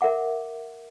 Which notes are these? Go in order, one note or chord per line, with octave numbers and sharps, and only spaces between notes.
A#4 E5 F#5 D6